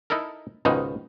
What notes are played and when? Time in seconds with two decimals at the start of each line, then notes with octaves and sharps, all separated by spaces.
0.10 D#4 E4 A4 A#4
0.65 C#2 G#2 B2 D#3 D#4